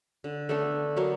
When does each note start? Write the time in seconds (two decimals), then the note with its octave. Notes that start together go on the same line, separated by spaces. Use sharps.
0.24 D3
0.49 A3 B3 D4 A4
0.96 F#3 A#3 B3